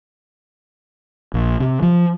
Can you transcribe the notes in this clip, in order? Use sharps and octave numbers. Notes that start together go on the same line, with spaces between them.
A#1
C3
F3